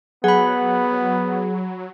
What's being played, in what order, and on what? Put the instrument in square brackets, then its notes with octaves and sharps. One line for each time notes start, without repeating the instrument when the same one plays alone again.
[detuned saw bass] F#3 [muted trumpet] B3 [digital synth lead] G#4 [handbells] F#5 B5